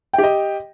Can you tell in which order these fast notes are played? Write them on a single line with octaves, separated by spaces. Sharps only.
G5 G4 D#5